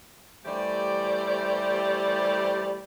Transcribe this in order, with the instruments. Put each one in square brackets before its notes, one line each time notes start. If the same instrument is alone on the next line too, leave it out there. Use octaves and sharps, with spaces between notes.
[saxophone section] E3 G3 A3 G4 C5 D5